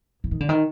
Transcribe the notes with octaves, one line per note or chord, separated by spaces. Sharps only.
E3
D#3
D3
D#3